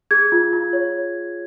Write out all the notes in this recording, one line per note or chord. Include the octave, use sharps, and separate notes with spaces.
G#4 G#6
F4
F4
C#5